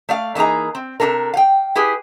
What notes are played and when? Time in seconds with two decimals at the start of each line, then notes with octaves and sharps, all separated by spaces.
0.09 A3 D5 F5
0.35 E3 A#3 D#4 G#4 A#5
0.75 C4
1.00 C3 G#3 D4 A4 A#4
1.34 F5 G5
1.75 E4 G4 G#4 B4